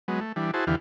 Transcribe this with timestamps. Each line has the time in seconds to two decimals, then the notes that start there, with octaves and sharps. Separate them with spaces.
0.08 F#3 G#3 B3
0.21 A3
0.36 E3 G3 D4
0.54 E4 F#4 G#4 C5 A5
0.67 E2 D3 E3 G4 F5